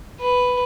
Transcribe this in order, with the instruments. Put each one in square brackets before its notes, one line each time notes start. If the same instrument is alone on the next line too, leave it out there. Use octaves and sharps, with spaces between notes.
[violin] B4